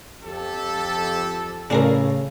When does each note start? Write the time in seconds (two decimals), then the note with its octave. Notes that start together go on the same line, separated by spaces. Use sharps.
0.24 F2 G4 A4
1.70 A2 C#3 D4 G#4 A#4 F5